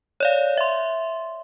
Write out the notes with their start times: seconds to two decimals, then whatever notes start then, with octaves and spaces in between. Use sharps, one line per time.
0.20 C#5 D5 F5
0.57 E5 C6